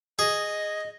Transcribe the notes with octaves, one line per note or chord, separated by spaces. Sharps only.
G#4 D#5